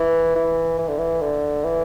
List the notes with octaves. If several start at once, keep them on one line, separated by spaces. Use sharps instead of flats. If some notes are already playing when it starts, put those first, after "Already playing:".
Already playing: E3
E3
E3
D3
E3
D3
E3